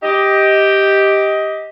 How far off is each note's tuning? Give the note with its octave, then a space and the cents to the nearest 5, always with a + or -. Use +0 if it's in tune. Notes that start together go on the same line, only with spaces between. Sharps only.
G4 +0 D#5 +15